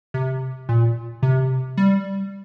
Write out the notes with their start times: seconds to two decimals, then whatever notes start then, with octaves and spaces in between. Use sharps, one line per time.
0.14 C3
0.69 A#2
1.23 C3
1.77 G3